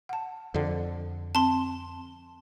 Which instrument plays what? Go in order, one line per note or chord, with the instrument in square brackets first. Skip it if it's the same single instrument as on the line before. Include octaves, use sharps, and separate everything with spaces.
[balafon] F#5 A5
[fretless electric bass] F2 D3
[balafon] C4 [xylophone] A5 C6